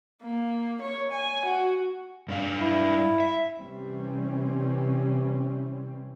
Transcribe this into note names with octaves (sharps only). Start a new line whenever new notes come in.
A#3
C#5
G#5
F#4
G2 D4 F5
E4
E5
C3 E3 G3 C4 C#4